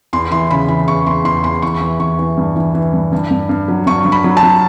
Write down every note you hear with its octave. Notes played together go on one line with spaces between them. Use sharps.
E2 C6
E3 C6
C#3 B5
E3 B5
E2 C#6
E2 C6
E2 C6
E2 C6
E3 C#6
E3
E3 C#6
E3
G2
E3
E3
G2
G2
G2
G2
F#3
G2 C#6
G2
B5
F#3
A5
F#3